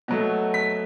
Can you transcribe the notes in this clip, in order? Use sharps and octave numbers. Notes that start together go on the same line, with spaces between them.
B2 F#3 A3
B6